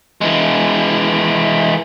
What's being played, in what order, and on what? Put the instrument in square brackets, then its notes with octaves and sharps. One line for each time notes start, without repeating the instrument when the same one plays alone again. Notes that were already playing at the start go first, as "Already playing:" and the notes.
[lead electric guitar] E3 G#3